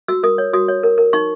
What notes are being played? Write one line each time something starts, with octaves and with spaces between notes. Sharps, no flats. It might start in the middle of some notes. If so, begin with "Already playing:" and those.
F#4 E6
A#4 D#6
C#5
F#4 D#6
C#5
A#4
A#4
D#4 C#6